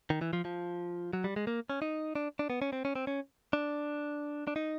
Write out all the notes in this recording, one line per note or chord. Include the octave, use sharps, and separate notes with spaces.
D#3
E3
F3
F3
F#3
G3
G#3
A#3
C#4
D#4
D4
D4
B3
C#4
C4
C#4
C4
C#4
D4
D4
D#4